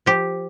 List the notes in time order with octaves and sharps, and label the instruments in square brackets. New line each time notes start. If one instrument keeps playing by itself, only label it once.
[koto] F3 G4